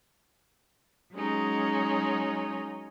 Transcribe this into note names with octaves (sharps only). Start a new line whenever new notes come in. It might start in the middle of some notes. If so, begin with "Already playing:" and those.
F#3 G#3 C#4 D#4